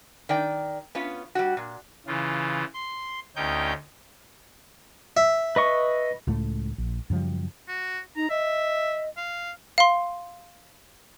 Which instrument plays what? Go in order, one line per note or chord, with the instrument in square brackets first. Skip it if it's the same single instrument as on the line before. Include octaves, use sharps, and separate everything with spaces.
[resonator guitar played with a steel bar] D#3 D5 G5
B3 C#4 F4
G3 F#4
A#2
[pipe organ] C#3 E3 F4
C6
D2 C#4 D#4 G5 G6
[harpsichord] E5
[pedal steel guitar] B4 D#5 C#6
[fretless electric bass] C#2 A2 A3
A#1
F#2 C#3 F3 G3
[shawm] F#4
[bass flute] D#4 [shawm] A#5
[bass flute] D#5 [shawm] E5
[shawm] F5
[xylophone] F5 C6